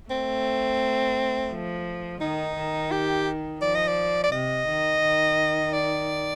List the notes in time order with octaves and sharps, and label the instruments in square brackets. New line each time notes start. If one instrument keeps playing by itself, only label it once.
[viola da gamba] A3 [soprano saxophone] C4
[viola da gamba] F3
[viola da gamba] D#3 [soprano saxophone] D#4
[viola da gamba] D#3
[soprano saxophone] G4
[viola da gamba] F3 [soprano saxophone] D5
[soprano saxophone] D#5
D5
D5
[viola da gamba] C3 [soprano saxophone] D#5
[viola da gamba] D#3
D#3
[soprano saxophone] D5